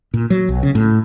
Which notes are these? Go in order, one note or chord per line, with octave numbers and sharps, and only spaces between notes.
A#2
F#3
B1
C#3
A2